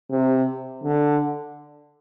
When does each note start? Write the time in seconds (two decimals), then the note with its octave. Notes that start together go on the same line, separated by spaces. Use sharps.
0.11 C3
0.84 D3